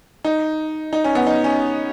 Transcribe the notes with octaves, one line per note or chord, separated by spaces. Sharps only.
D#4
D#4
C#4
B3
D#4
C#4